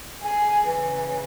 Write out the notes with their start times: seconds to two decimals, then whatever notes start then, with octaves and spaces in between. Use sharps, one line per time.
0.23 G#4
0.67 C#3 E3